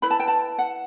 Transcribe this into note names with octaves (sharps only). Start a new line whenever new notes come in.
E4 B4 B5
A5
G5
A5
F#5